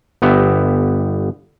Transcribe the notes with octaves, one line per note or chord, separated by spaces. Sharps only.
G1 B3 G4 E5